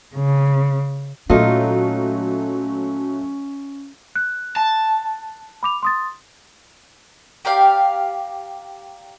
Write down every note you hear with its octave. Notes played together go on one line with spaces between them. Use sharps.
C#3
A#2 F#3 A3 C#4 D#4 F4
F#6
A5
B5 D6 F7
C6 D#6 A6
G4 A#4 D5 F5